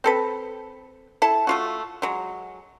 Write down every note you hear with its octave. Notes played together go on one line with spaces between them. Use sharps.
C4 A4 B4
E4 A4 A5
A3 F4 F#4
F#3 G#3